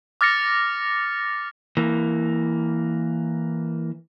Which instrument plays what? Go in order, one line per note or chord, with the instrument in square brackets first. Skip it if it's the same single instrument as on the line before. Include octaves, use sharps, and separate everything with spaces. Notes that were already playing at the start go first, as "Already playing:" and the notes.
[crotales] D6 F6 A6 A#6 C#7
[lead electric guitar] E3 A#3